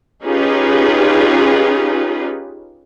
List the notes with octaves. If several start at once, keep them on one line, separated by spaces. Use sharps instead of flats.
C#4 D#4 F4 G4 G#4 B4